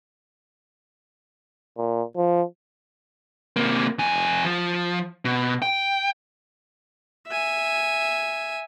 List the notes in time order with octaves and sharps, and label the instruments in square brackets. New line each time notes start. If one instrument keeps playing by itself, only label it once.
[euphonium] A#2
F3
[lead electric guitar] C3 A#3
F2 G#5
F3
B2
G5
[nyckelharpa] E5 G#5